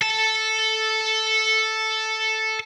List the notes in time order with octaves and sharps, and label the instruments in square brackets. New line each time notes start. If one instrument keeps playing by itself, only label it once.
[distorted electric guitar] A4 A5